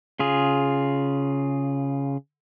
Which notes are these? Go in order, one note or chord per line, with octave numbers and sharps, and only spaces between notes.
C#3 F4 G#4